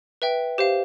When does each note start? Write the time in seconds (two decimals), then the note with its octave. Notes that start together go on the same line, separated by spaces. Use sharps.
0.22 B4 E5 G5
0.58 G4 C5 F5